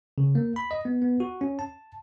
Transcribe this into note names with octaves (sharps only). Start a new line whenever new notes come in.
C#3
A#3
B5
D#5
B3
B3
F#4
C#4
A5